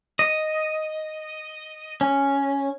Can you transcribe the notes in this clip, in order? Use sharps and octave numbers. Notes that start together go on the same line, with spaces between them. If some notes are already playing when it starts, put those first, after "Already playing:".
D#5
C#4